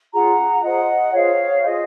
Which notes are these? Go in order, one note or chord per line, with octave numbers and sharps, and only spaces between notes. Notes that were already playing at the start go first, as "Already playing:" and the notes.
C#4 F4 G#4 F#5 A#5
F4 G#4 C5 D#5 F#5
F4 G#4 C5 C#5 F5
F4 G#4 C5 D#5